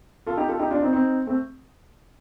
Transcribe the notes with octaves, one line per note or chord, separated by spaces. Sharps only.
F4 A4
D#4 G4
F4 A4
D#4 G4
D4 F4
C4 D#4
C4 D#4
A3 C4